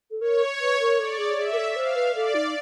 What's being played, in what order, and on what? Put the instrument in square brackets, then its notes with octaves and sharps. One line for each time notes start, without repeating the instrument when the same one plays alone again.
[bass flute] A4
[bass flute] A#4 [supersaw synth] C#5
[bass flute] B4
A#4
[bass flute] A4 [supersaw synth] D5
[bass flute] G#4
[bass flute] G#4 [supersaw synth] E5
[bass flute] A#4
A4
[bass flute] C5 [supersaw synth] F5
[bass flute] B4
[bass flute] A4 [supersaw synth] D5
[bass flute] D#4